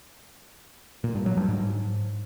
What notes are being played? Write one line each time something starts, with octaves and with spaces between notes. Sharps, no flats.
A#2
G2
F#3
G2
G#2